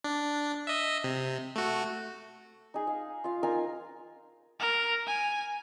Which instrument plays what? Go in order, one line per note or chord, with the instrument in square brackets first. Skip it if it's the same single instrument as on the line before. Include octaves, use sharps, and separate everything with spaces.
[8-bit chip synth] D4
D#5 E5
C3
A3 F#4
[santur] D#4 G#4
F5
F4 F5
D#4 F4 A#4 G#5
[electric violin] A#4
G#5